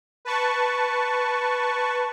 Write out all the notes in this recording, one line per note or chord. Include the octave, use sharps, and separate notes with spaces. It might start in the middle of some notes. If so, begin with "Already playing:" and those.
B4 A5 C#6